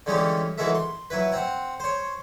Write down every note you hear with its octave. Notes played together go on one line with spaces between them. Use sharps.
D3 E3 G3 G#3 C#4 G4
E3 F#3 G#3 A3 A#4 E5
C6
F#3 E4 B4
C4 F#5
C5 C#5